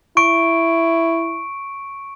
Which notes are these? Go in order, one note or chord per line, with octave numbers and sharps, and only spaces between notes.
E4 C#6 D7